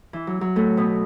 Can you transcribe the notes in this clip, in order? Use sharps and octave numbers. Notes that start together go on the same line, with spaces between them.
E3
F#3
F#3
A2 A3
B2 B3